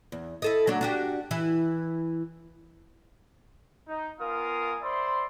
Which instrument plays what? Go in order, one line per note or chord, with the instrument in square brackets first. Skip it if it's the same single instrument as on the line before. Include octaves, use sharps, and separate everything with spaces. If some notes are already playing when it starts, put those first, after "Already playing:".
[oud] E2
E4 A4 D#5
F#3 A3 D4
D4 F#4 G4
E3 E4
[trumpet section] D#4
B3 F4 A#4 F5 G#5 D#6
C5 D5 E5 B5 C6